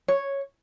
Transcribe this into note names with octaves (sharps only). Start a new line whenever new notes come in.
C#5